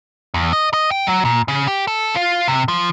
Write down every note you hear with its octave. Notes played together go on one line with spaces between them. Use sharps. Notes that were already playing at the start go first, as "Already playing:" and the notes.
E2
D#5
D#5
G5
F#3
A#2
C#3
G4
A4
F4
C3
F3